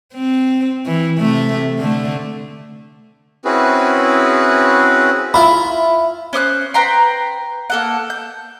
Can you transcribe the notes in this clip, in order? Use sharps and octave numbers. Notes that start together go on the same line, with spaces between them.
C4
E3
C3 A3
D3 A3
C4 C#4 E4 F#4 G#4 B4
E4 F4 E5 B5
C#4 C5 D#6 F#6
B4 G5 A#5 C6
A#3 A4 F#5
G6